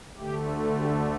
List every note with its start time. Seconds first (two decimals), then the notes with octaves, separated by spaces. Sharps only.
0.16 D2 D3 A3 G4
0.77 G4